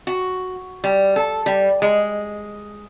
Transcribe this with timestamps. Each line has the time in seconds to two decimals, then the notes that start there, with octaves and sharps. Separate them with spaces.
0.07 F#4
0.84 G3
1.16 A4
1.46 G3
1.82 G#3